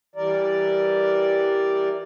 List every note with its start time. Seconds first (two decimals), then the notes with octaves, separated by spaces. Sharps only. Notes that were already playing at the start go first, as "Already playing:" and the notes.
0.16 E3 G3 A#4 D5